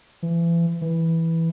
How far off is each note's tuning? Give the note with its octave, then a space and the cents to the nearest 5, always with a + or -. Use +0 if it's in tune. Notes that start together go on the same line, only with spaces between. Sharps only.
E3 +35
E3 -5